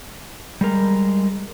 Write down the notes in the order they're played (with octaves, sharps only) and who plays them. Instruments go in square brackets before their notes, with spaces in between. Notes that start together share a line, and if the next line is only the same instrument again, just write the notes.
[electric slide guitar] G3 G#3 A#4